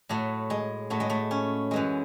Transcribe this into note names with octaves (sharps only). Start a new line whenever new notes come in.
A2 F#3 A3
G#3
A2 F#3 A3
G#3
A3
C#4
F#2 E3 G#3